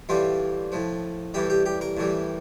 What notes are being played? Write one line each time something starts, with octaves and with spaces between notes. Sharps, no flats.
A2 E3 G3 F4
A2 F3
A2 E3 G3 G4
G4
G4
A#4
A2 E3 G3